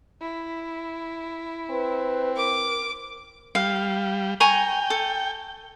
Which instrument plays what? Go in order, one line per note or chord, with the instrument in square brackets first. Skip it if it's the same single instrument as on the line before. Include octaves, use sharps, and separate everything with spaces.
[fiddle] E4
[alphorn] C4 [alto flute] B4
[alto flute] A#4 [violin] D6
[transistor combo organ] G3 [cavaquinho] F5
[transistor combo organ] G5 [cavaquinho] G#5 A#5 C#6
[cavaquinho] A4